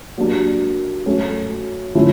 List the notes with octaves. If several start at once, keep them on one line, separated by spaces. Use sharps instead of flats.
F#3 A#3 D4 G4
F#3 A3 C#4 F#4 A4
D3 F3 A3 C#4 E4